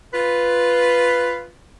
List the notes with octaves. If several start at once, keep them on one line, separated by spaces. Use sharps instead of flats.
F4 B4